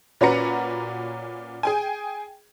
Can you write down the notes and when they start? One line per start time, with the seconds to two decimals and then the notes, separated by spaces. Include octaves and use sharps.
0.21 A#2 C#4 F#4 B4 A#5 C#7
1.63 G#4 G5 G#5